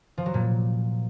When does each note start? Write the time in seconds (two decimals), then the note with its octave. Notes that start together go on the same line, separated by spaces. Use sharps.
0.18 F3
0.26 F#3
0.34 A#2